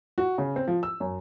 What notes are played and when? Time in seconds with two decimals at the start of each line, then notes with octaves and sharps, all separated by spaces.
0.18 F#4
0.38 C#3
0.56 C4
0.68 F3
0.83 E6
1.00 F#2